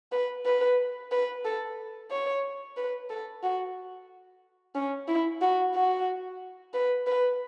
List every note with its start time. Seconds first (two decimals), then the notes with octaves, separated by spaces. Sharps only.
0.12 B4
0.46 B4
1.11 B4
1.45 A4
2.11 C#5
2.77 B4
3.10 A4
3.43 F#4
4.75 C#4
5.08 E4
5.41 F#4
5.74 F#4
6.74 B4
7.07 B4